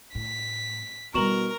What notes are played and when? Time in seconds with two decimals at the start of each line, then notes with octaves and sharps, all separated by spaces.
0.15 A2 B6
1.14 B2 G3 E4 A#4 A#5 C#6 E7 F#7